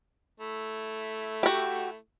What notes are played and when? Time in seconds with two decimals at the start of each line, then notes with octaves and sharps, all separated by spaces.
0.40 A3 E4
1.43 F#4 G4